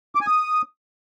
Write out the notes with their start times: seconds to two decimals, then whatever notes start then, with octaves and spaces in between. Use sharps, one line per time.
0.15 D6
0.21 G#5
0.27 D#6